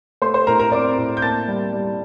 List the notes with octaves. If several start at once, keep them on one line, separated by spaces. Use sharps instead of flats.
A3 C5 C6
C5 C6
A2 A#4 A#5
A#4 A#5
C4 D5 D6
A2
G6
A#3 A5 A6
G3
G3